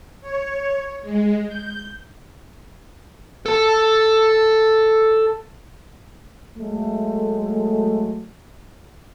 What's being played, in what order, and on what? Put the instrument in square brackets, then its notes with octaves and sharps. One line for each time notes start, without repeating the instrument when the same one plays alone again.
[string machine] C#5
G#3
G6
[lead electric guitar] A4 A5
[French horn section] F#3 G#3 A3